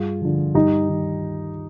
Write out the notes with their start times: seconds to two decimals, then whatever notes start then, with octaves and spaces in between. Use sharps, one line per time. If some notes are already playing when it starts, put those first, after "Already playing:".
Already playing: G2 F4 G#4
0.22 D3 F3
0.55 G2 D#4 G4
0.89 D#3